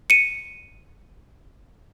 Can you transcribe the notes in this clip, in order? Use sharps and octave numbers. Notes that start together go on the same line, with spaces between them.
C#7 D#7